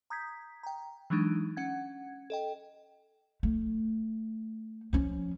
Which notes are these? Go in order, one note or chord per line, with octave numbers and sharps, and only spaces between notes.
A#5 D#6 G6 G#6 B6
G5 A#5
E3 F#3 G#3 D4 D#4
C#4 F#5 G#6
A4 D#5 G5
A3
F3 C#4